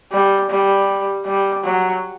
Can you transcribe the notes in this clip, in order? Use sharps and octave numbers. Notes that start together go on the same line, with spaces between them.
G3
G3
G3
F#3